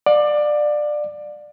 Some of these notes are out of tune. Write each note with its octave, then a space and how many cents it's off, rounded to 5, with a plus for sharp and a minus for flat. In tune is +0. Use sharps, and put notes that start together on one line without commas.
D5 +20 F5 +45